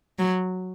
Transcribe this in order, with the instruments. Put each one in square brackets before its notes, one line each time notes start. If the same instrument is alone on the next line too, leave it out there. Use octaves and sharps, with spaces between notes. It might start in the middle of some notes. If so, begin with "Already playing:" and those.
[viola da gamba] F#3